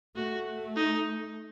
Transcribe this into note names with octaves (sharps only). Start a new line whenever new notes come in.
A3 F#4
D#4